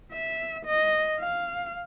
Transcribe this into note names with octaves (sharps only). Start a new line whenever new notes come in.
E5
D#5
F5